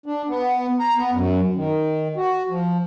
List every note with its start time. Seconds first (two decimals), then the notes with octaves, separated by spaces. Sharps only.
0.06 D4
0.28 B3
0.80 A#5
0.97 B3
1.13 F#2
1.55 D#3
2.17 F#4
2.49 F3